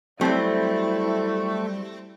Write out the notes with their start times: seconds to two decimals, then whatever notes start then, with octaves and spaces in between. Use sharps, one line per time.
0.21 F#3 G3 A3 C4 E4